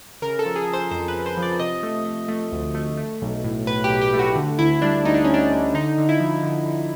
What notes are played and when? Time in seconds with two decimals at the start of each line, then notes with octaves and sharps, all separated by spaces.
0.22 C#3 A#4
0.39 A4
0.45 F3
0.56 G#4
0.68 F3
0.73 C5
0.91 F2 C5
1.08 B4
1.14 F2
1.26 C5
1.37 F3
1.42 D5
1.59 C3 D#5
1.83 A3
2.05 A3
2.28 A3
2.52 D2
2.75 A3
2.97 A3
3.22 B1
3.44 A2
3.67 A2 B4
3.84 G4
3.89 B1
4.01 G4
4.13 A3
4.19 F#4
4.36 D3
4.59 D2 E4
4.82 G3 D4
5.05 D2 D#4
5.14 D4
5.24 D2 C#4
5.34 D4
5.52 D2
5.74 D3 D#4
5.98 D3
6.09 E4
6.20 F3
6.43 D3
6.66 D3